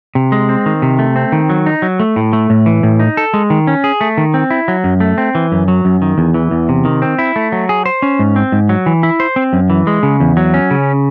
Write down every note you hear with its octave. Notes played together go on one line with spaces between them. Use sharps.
C3
G#3
C4
D#3
C3
A3
C4
D#3
F#3
D#4
F#3
A3
A2
A3
A2
E3
A2
D#4
A4
G#3
D#3
C#4
G#4
A3
D#3
C4
E4
F#3
F#2
A3
C4
E3
F#2
F#3
F#2
D#3
E2
E3
E2
C3
D#3
C4
E4
A3
F#3
G#4
C5
C#4
G#2
C4
G#2
F#3
E3
E4
C5
C4
F#2
E3
G#3
C#3
E2
F#3
C#4
C#3